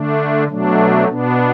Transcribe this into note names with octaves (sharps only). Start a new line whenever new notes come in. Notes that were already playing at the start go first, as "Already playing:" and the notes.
Already playing: D3 A3 D4
B2 F#3 A3 D4
B2 B3 D4